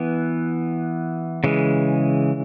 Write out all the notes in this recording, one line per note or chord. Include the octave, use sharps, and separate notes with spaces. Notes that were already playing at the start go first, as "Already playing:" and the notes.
Already playing: E3 B3
C#3 E3 G#3